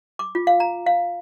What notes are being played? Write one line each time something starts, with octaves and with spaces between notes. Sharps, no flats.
D6
F4
F5
A#5
F5